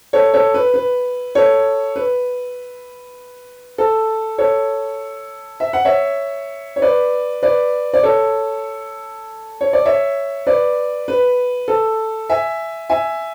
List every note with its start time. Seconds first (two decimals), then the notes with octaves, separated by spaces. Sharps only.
0.13 A4 C#5
0.34 A4 C#5
0.54 B4
0.74 B4
1.35 A4 C#5
1.96 B4
3.78 A4
4.38 A4 C#5
5.60 E5
5.73 F#5
5.85 C#5 E5
6.76 C#5
6.82 B4 D5
7.43 B4 D5
7.93 D5
8.03 A4 C#5
9.61 C#5
9.73 D5
9.85 C#5 E5
10.47 B4 D5
11.08 B4
11.68 A4
12.30 E5 G#5
12.90 E5 G#5